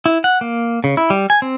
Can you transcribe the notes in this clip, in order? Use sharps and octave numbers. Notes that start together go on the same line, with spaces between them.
E4
F#5
A#3
C#3
E4
G3
G#5
C4